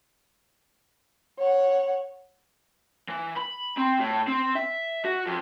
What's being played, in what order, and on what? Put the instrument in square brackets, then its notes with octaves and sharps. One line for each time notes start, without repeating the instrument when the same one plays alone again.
[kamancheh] C#5 F#5
[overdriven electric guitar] E3
B5
C4
A2
C4
E5
F#4
F2